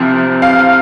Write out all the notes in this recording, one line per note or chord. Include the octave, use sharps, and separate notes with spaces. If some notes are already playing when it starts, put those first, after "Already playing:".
Already playing: C2 C3 F3
F5